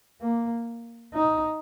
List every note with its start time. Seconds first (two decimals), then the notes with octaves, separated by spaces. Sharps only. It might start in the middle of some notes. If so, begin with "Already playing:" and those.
0.21 A#3
1.14 D#4